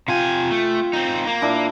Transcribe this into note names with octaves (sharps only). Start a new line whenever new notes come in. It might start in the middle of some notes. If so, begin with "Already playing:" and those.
C3 F4 G5 G#5
A3
C4 D#4
A#3
A#2 D4 E4